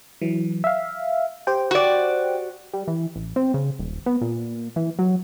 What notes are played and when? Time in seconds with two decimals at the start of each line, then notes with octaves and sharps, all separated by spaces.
0.21 E3 F#3
0.64 E5 F5
1.47 G4 C5 G5
1.71 F#4 D5
2.74 G3
2.88 E3
3.15 A1
3.36 C4
3.54 C#3
3.79 D#1
4.06 B3
4.21 A#2
4.76 E3
4.99 F#3